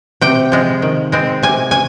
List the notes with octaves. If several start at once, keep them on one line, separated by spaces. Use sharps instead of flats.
C3 G5
F3 G#3
D#3
G#3 C4
C3 G#5
G#5